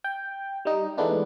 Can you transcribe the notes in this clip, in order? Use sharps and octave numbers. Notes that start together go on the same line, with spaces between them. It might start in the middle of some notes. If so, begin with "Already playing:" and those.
G5
G3 D#4
E3 G#3 A3 B3 D4 D#4